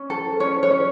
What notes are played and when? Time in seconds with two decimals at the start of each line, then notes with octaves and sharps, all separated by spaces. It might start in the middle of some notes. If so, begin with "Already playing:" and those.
Already playing: C#4
0.10 A4
0.40 C#4 C#5
0.63 C#5
0.71 C#4